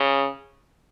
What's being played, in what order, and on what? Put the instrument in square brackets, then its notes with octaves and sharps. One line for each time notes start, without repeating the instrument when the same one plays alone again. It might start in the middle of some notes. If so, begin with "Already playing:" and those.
Already playing: [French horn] C#3